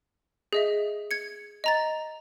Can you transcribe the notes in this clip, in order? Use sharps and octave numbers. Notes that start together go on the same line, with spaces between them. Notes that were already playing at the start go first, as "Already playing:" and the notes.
G#4 D#5 E5
G#6 C#7
D#5 A#5 A6